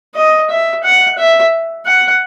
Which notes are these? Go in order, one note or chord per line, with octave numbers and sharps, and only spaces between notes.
D#5
E5
F#5
E5
F#5